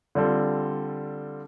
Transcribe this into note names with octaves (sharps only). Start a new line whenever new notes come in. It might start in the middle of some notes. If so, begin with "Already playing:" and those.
D3 G3 C4 F4 A4